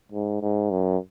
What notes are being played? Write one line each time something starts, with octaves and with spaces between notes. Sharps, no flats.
G#2
G#2
F#2